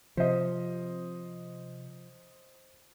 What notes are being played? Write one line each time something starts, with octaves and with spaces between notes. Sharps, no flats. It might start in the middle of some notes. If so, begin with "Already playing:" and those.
C3 F3 C5 D#5